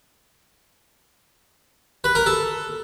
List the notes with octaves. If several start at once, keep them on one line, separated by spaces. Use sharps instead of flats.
B4
A#4
A4